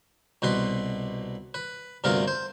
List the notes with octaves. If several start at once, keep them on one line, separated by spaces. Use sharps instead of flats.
C2 B2 B4 C6
B4
D2 G2 C3 B3 F4 A#4
C5